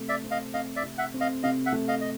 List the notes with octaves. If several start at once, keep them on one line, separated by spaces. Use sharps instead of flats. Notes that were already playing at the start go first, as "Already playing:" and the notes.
Already playing: C3 A3
D5 E5
C4
D#5 F5
C4 D#5 F5
D5 E5
C3
E5 F#5
C4
D#5 F5
C3 D#5 F5
E5 F#5
A3
D#5 F5
D#5